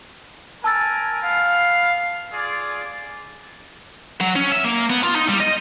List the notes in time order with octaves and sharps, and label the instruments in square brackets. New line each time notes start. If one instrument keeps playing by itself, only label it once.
[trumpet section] A#4 G#5 [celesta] A5 E6 A6
[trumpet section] B3 F5
F4 G#4 D5
[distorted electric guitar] F#3
C#4
E5
A#3
B3
F4
D#4
G3
D#5